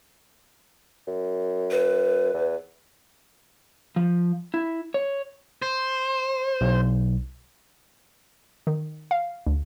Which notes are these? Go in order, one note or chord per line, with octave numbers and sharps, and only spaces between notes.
F#2
B4
E2
F3
E4
C#5
C5
B1
D#3
F5
D2